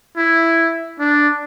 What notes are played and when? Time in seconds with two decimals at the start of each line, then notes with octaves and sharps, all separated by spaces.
0.17 E4
0.99 D4